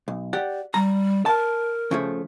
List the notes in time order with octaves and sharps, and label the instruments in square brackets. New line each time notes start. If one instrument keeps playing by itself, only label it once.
[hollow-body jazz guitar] B1
G4 D5 F#5
[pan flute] G3 [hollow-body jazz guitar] A#5
[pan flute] A#4 [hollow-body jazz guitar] A5
[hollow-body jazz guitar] C#3 F3 A3